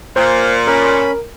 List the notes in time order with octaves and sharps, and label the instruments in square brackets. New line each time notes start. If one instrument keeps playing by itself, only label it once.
[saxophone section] A#2 [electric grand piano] C5 [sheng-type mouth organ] F5
[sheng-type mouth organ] C#4 B5 [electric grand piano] A#4